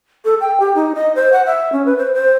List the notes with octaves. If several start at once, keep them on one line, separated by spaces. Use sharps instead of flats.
A4
G5
G4
D#4
D#5
C5
F#5
E5
C#4
B4
C5
C5